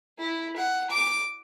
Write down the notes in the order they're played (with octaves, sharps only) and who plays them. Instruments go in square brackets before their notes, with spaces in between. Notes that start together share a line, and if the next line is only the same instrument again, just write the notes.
[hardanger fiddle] E4
F#5
D6